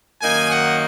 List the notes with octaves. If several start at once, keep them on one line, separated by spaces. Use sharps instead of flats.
F#2 D#3 A#3 D#4 G#5
F#5